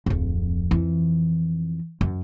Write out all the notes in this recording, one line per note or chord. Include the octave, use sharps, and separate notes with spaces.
D1 F2
F2 E3
F#2